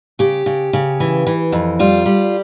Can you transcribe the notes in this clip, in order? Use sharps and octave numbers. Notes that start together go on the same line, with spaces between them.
C#3 G4
C#3
C#3
E3
E3
F2
G3 F4
G3